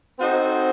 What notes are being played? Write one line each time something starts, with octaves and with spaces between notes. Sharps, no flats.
C4 D#4 F#4 A4 C5